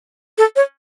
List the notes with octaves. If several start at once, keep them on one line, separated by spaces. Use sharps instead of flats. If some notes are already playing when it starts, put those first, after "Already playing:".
A4
C#5